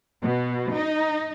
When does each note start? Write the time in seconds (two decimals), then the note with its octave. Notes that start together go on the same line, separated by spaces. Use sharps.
0.23 B2
0.73 D#4